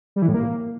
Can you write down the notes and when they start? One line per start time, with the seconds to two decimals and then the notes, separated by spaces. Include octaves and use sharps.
0.16 G3
0.22 E3
0.28 A2
0.34 A#3